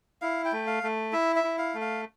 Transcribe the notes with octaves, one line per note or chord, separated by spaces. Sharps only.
E4 F5
G5
A3
F5
A3
E4 E5
E5
E4
F5
A3
F5